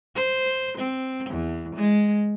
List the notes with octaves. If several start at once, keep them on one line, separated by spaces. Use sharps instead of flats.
C5
C4
E2
G#3